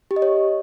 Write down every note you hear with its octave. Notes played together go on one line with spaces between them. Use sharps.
G4
D#5
C#5